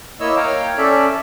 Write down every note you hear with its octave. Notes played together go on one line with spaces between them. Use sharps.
A#3 E4 C#5 D#5 E6
C#5 F5 G5 A#5
C#4 A4 D5 E5